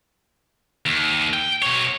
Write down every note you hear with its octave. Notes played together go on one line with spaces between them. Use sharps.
D#2
G5
B2 C#5